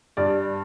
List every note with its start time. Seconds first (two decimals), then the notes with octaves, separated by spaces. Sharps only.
0.17 G2 D5